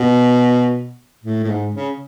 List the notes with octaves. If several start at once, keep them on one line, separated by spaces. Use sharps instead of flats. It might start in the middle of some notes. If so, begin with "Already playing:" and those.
Already playing: B2
A2
A2
G#2
C#3